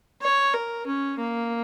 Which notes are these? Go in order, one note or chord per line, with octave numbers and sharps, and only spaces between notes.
C#5
A#4
C#4
A#3